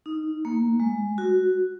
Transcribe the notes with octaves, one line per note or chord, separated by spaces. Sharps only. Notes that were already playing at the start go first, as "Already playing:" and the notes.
D#4
A#3
G#3
F#4